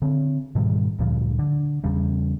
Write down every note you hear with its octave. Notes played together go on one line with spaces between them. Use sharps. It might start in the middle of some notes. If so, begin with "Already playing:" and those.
D3 C4
G#2 B2 D#3 G3
D2 G2 A#2 F3
D3
E2 C#3 G3